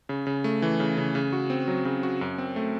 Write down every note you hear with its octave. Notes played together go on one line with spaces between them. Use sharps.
C#3
C#3
A3
E3
C#3
C#3
C#3
F#4
C4
F#3
C#3
F#4
F#2
C4
A3